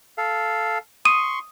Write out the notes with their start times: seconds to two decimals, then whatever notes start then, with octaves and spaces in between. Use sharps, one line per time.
0.18 A4 F5
1.05 C6 C#6 D#6 D#7